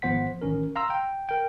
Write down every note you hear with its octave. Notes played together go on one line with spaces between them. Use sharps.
G#1 F3 B3 C5 F#5 B6
A1 D#3 C#4 A#4
F5 A#5 C6 E6
G5
A#4 G5